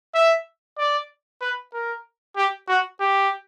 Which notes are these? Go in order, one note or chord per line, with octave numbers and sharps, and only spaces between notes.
E5
D5
B4
A#4
G4
F#4
G4